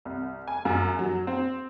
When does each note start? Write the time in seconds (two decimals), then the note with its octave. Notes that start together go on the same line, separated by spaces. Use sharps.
0.05 C2
0.48 G#5
0.65 F#2
0.99 F#3
1.27 C4